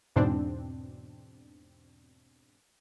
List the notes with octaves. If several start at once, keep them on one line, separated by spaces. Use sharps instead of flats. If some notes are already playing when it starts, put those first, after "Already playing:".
E2 G#2 B2 C4 D4